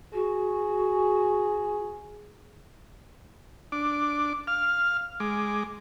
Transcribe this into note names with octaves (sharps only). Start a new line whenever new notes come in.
F#4 G#4
D4 D6
F5 F6
G#3 D6